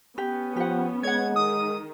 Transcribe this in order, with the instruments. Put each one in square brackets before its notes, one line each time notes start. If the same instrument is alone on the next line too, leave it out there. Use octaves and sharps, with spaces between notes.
[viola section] B3 C#4 [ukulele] G4
[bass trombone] F3 [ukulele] G4 F#5
[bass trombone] G#3 [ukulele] C#5 F#5 [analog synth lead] G#6
[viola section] D#3 [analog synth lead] D#6